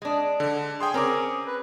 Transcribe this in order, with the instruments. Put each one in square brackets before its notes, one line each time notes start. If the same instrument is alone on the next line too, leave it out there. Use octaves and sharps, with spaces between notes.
[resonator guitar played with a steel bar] G#3 D4
[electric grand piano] D3
[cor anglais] G#4 [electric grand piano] G5 G#5 C6
[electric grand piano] C4 D6 [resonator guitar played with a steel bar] C#4 A#4
[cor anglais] B4